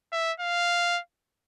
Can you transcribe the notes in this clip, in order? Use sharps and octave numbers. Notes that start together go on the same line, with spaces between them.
E5
F5